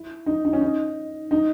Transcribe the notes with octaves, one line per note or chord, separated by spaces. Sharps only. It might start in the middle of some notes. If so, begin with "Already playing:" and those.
Already playing: E4
D#4
D#4
C#4
D#4
D#4